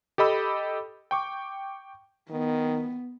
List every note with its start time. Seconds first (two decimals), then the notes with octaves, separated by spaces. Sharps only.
0.18 G4 A4 D#5 B5 E6
1.11 G5 C#6 D6
2.30 D#3 B3